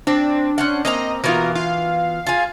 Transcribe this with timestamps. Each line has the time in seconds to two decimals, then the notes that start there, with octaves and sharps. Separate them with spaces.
0.07 C4 D4
0.58 C#4 C5 F#5
0.85 A#3 C4 D#5 A#5
1.24 B2 E3 A#3 B3 F4 A#4
1.55 F4 F5
2.26 F4 G#4